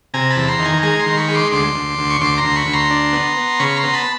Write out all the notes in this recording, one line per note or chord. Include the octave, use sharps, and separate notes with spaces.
C3 G#5 A#5
A5 B5
E2
A#5 C6
D#3
G#5 A#5
G#3 G#5 A#5
A#5 C6
D#3
B5 C#6
G#3
C6 D6
D2 C6 D6
D2
D2
C#6
D2 C6 D6
A#5 C6
D2
B5 C#6
D2
A#5 C6
D4
B3
B3
C#3 B5 C#6
A#5 C6
B3
A5 B5